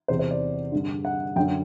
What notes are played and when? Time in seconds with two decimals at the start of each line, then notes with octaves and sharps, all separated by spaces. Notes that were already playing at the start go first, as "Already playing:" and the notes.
0.08 E2 C3 E3 C5
0.19 C5
0.31 D5
0.72 G2 D3
1.05 F#5
1.36 F#2 G5
1.40 D3